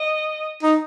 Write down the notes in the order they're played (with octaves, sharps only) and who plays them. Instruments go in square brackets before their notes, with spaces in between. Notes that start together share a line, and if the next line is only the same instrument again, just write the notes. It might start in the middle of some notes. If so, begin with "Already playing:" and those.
Already playing: [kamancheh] D#5
[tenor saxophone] D#4